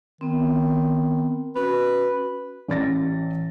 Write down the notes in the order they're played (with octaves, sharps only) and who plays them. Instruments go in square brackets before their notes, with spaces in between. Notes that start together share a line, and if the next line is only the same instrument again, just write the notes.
[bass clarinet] D#3 [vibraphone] B3 C4
[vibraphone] C#4 F#4 [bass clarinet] B4
[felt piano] A1 D5 A6 A#6